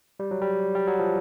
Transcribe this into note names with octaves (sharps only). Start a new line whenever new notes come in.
G3
F#3
G3
G3
F#3
F3